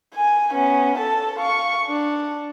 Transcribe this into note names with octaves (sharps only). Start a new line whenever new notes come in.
G#5
B3 C#4
A4 A5
F5 C#6
D4